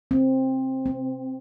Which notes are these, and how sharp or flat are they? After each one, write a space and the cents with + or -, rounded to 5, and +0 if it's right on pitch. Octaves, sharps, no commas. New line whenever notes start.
C4 +10
C4 -20